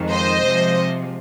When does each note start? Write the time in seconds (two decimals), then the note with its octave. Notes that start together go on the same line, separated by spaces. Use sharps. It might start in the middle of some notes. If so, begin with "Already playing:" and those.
Already playing: F2 D#3 G#3
0.11 C5 D#5
0.43 C3 F3 G#3